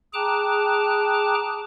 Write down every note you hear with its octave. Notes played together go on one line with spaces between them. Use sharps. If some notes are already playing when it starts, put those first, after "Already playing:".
G#4 G5 A5 A#5 D6 F#6